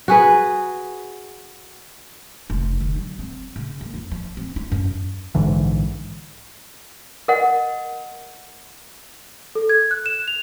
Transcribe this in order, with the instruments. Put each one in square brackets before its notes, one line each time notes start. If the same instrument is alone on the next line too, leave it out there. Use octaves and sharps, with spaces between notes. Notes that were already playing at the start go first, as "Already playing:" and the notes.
[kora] F#4 G#4 B4
[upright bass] F1
D3
F#3
C4
C#3
A#3
F2
F3
C4
E4
F#2
[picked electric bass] A#1 G#2 D3 E3
[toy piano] A#4 D#5 F#5
[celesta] A4
G#6
F#6
E7
F7